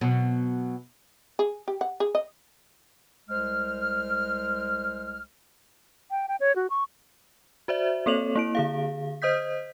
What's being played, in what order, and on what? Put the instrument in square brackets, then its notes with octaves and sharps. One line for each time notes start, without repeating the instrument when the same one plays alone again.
[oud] B2 F#3
[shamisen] G#4
G4
F#5
G#4
D#5
[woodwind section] C2 G#3 C5 F6
[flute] G5
G5
C#5
F#4
C#6
[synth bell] F#4 C5 D5 E5
A#3 C4 A4 C#5 F7 F#7
A#3 E4 D7
D3 G#4 F5
C5 D#5 D#6 G6 B6